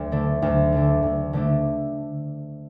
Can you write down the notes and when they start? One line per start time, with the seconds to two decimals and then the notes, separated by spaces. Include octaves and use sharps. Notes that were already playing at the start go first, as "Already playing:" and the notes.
Already playing: D2
0.12 D3 A3 D4
0.42 D2
0.72 D3 A3 D4
1.03 D2
1.33 D3 A3 D4